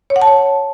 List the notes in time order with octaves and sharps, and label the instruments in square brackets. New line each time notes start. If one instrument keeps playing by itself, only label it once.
[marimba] C#5
F#5
A5
C#5